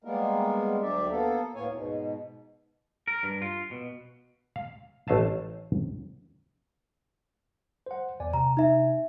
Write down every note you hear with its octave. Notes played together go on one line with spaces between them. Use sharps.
G3 G#3 A#3 B3 A#4
D2 F#3 D4 G4 D5 E5
A#3 B3 A4
D2 A2 A#3 B3 C#5 G#5
G#2 B2
A#4
G2
F4
B2
F5
A1 A3 C5 D#5 F5 A5
C5 F#5
E2 D5 G#5
C3 A#5
D#4 E5